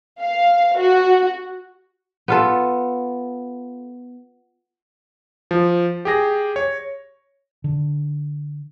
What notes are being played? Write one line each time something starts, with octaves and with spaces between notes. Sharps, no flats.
F5
F#4
B3 F4 A4
F3
G4 G#4 A#6
C#5
D3